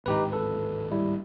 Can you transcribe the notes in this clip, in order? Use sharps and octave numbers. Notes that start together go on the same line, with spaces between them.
D1 G#1 G#3 D#4 G4 B4
A4 B4
G3 E4